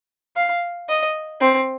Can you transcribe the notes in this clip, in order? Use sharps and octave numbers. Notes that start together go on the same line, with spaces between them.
F5
D#5
C4